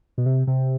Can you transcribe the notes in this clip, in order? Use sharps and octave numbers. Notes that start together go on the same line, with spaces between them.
B2
C3
C3